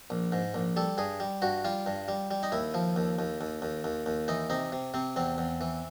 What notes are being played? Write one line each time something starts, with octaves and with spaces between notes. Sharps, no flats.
A#1
G#2
A#1
G3 A4
G2 G#4
G3
G2 F#4
G3 F4
G2
G3
G3
D#4
D#2 E4
F3
D#2
D#2
D#2
D#2
D#2
D#2
E3 D#4
C3 D#4
C3
C3 C4
E2 C4
E2
E3